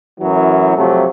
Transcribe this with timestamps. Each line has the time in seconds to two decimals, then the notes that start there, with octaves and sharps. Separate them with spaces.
0.21 F#2 A2 E3 F#3
0.76 C3 F3 F#3 A3